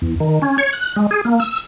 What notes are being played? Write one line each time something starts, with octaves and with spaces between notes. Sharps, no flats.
E2
D#3
C#4
C#5
F#6
G#3
G#4
A#3
E6